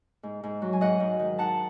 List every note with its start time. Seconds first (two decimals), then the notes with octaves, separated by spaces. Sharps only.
0.23 G#2
0.43 G#2
0.62 F#3
0.73 G#5
0.81 G#2 D#5 F#5
1.00 G#2
1.19 D#3
1.38 D#4 F#5 A5